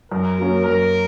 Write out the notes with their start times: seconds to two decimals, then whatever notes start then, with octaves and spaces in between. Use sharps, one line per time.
0.11 F#2 A#4
0.38 F#3 A#3 C#4
0.65 F#2 A#4